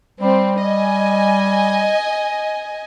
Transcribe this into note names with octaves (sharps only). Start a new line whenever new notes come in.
G3 C4
D#5 G#5